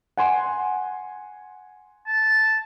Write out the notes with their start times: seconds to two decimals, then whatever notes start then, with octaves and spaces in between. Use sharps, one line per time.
0.17 F#5 G#5 C6
2.07 A5